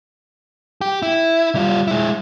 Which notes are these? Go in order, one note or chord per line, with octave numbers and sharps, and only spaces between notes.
G4
E4
G3 F4
G#3 E4